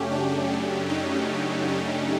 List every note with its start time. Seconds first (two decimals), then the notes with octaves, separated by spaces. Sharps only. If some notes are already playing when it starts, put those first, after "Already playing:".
Already playing: F#2 C#3 F#3 A3 C#4 G4
0.12 D4
0.51 D4
0.89 D#4
1.68 C#4